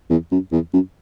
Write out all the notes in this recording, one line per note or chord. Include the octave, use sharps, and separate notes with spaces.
E2
F#2
E2
F#2